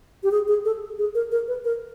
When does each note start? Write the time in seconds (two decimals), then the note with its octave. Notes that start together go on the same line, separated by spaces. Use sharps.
0.23 G4
0.31 G#4
0.48 G#4
0.65 A4
0.98 G#4
1.15 A#4
1.32 A#4
1.48 B4
1.64 A#4